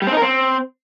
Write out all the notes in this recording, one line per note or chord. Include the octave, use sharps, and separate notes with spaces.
G3
C4
D#4
A#4
C4